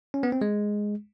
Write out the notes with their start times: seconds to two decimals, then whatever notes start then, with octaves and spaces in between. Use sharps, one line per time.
0.14 C#4
0.23 B3
0.32 C4
0.41 G#3